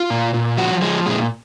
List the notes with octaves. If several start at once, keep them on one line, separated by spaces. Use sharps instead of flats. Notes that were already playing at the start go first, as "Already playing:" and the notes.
Already playing: F4
A#2
A#2
F3 F#4
F3 G#3
A#2 G#3